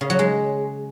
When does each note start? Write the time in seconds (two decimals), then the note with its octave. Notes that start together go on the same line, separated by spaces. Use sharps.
0.01 C#3
0.10 F#3
0.19 G#3